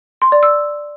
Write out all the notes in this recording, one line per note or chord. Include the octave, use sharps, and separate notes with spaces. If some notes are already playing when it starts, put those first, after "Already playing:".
C6
D5
E6